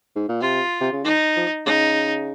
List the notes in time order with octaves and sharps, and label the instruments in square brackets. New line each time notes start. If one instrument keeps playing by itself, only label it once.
[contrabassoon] G#2
A#2
[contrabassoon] C3 [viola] F4
[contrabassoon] C3
C#3
[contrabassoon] D#3 [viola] D#4
[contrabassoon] F3
[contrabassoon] C#3 [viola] D#4